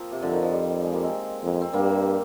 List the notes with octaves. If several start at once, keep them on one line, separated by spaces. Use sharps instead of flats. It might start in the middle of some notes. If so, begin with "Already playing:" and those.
Already playing: F3 A#3 C4
C3
F2 D3
D#3
F3
G3
G#3
G3 A#3
G#3 C4
F2
C4
G2 G3 A#3